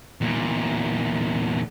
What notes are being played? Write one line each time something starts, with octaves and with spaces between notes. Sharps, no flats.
E2 A#2